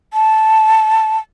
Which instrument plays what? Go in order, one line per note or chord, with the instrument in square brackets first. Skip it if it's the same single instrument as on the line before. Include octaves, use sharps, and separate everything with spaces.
[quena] A5